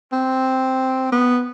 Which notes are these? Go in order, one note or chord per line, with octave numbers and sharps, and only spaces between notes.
C4
B3